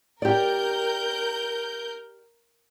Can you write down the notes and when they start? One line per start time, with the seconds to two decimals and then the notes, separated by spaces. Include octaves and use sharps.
0.22 G4 A#4 D5 G6